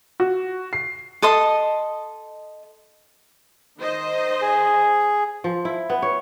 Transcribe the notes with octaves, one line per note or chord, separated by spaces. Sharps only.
F#4
C7
A4 D#5 C6 D#6
D#3 C5 D#5
G#4
F3
E4
B3
C#5